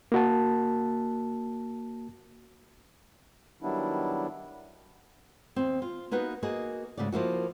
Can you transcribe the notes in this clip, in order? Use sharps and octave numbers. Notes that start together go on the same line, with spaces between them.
A#3 F#4 A5
D#3 F#3 G3 B3 D4 E4
D#2 C4
F4
A#3 B3 D#4 F#4 B4
A#3 F#4 G#4 D#5
G#2 C#3 A3 F#4 D5
F3 A#3 E4 F#4